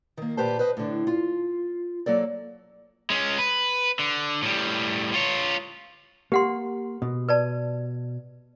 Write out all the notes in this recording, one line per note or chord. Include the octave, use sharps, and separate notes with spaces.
D#3 A#3
A#2 G4 B4 C5 A5
B4 C5 D#5
A2 D3
F4
F#3 A#3 A4 D5
G#3 C#4
B4
D3
A2 G3
F4 C#5
A#3 G4 F#5 C6
B2
B4 D5 A5